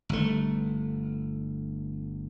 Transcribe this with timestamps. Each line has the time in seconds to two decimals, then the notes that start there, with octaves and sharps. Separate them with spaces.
0.09 G1 A3